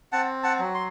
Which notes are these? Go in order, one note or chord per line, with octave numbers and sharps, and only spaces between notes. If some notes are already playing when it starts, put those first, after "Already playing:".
C4 F#5 A5
F#5 A5
F#3
C6